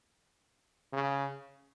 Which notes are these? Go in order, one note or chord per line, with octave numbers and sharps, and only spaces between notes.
C#3